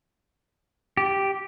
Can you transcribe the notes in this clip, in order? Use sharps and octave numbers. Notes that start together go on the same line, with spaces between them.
G4